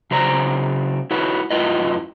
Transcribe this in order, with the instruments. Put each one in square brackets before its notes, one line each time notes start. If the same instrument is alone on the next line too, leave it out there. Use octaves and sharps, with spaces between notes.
[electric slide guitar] C#3 F#3 C5 D5 A#5
E4 F#4 B4 C#5
F#2 F#3 E4 F4 B4 D#5